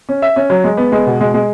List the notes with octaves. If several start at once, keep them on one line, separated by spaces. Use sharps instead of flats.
C#4
E5
C#4
F#3
G#3
B3
G#3
B2
G#3
G#3